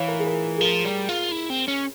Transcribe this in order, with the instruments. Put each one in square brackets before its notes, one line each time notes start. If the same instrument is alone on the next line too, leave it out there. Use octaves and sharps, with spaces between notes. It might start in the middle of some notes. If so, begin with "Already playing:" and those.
Already playing: [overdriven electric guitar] E3 [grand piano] C#5 F5
[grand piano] A#4
G#4
A#4
G#4
[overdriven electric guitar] F3 [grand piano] A#4
[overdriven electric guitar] G3
F4
E4
C4
C#4